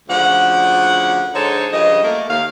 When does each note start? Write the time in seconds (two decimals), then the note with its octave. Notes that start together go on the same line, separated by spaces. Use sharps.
0.09 D2 C#3 F3 D5 F#5
1.34 D3 G#3 D#4 A4 C5 C#5
1.73 G2 C#3 F3 G4 D#5
2.02 A3 A#3
2.29 D#2 F5